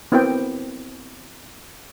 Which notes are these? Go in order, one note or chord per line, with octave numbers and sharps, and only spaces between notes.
B3 C4 E4 A#4 G5